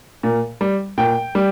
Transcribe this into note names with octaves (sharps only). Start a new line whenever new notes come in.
A#2
G3
A#2 G5
G3